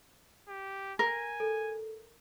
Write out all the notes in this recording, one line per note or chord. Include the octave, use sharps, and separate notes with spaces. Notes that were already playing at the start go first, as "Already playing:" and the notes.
G4
A#4 G#5
A4